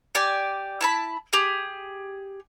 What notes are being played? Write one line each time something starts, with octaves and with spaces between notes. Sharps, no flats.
G4 D5 G#5
E4 A5 B5
G4 G#4